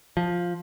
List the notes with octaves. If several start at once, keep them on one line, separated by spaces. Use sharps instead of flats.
F3